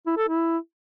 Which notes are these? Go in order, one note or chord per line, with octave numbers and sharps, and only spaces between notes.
E4
A4
E4